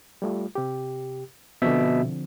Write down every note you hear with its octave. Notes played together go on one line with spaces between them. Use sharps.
G3 A3 F4
C3 G4
B2 D3 F3 C4 E5